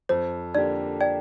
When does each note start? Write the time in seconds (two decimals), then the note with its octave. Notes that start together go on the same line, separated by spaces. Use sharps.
0.09 F2 C5
0.55 D3 A#3 D4 G4 D5
1.01 D5 G5